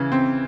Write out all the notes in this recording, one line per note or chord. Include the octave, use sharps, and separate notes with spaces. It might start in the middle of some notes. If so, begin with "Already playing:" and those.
Already playing: C#3 E3
C4